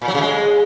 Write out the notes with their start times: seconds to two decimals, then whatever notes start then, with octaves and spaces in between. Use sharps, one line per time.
0.02 A#2
0.08 F#3
0.14 C#3
0.21 G#3